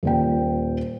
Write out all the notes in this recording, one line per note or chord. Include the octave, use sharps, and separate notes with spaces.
D#1 A#2 G5